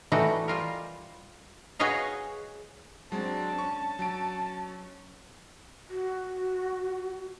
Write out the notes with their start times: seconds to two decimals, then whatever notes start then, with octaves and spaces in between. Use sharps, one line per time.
0.12 E3 G3 A3 D#4 F#4
0.48 G3 F4 A#4
1.79 F#4 G#4 B4 C#5 D#5 F5
3.12 F#3 G#3 C4 D4 A5
3.59 C#4 C#6
3.99 F#3 D7
5.90 F#4